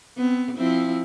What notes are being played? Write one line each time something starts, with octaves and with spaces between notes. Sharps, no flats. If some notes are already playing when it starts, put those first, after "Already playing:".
B3 C4
F3 C4 E4